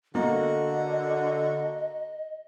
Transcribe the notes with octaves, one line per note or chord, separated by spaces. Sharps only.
D3 A#3 F#4 D#5